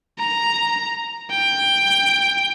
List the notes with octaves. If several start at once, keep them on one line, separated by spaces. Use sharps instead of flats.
A#5
G5